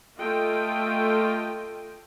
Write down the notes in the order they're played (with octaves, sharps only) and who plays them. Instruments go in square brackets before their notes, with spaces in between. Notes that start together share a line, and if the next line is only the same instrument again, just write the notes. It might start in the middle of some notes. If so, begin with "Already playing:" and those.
[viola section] A3 F4 A4 D#5 G5